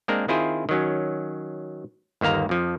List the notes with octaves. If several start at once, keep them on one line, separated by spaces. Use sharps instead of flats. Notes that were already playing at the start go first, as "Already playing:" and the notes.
G#3 A#3 C4 D4 A#4
D#3 C4 E4 F4 G#4 C5
D#3 F#3 C#4
G1 D#2 A#3 F5 A#5
F2 F3